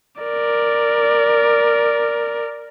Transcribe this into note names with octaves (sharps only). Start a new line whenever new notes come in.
A#4 D5